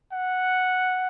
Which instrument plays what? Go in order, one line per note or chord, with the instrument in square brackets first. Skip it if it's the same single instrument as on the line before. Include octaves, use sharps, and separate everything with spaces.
[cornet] F#5